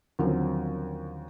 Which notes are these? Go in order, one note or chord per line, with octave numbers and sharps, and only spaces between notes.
D#2 D3 F3 F#3 C4 C#4